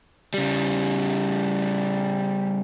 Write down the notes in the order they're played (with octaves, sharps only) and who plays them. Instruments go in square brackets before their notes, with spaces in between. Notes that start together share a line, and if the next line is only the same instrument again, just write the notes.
[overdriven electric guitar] C#3 G3